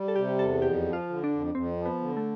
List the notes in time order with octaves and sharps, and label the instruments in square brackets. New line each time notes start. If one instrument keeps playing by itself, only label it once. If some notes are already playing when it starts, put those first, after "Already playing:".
Already playing: [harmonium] G3
[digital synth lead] A4
[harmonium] C3 [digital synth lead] G4
[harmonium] E2 [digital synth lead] A4
[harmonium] F2 [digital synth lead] G4
[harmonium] F3
[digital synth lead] F4
[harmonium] D3
[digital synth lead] D4
[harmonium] F2
[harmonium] F2 [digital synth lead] C4
[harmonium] F3
[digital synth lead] B3
[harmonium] D3
[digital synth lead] A3